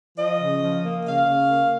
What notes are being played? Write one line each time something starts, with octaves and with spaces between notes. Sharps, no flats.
F3 D#5
C#3
F3
A#3
C#3 F5
C#3
A#3